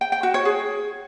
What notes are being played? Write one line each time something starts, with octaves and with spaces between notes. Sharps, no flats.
G5
G5
F#4
C#5
G#4